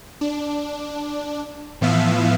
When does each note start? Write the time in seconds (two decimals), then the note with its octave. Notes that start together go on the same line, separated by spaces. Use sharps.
0.21 D4
1.81 A2 E3 F3 B3 E5 F5